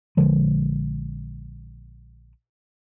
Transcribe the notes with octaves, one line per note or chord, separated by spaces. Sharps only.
A#1 D3 F3 G#3